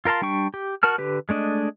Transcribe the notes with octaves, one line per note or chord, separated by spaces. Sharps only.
F4 A#4 F5 A5 C6
G3 D4 G5 C#6
G4
F#4 A#4 A5 F6
D3 G4 B4
G#3 A3 D4 D#5